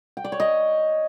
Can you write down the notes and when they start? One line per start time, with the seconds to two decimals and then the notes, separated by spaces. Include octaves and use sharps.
0.17 G5
0.24 D5
0.32 C#5
0.40 D#5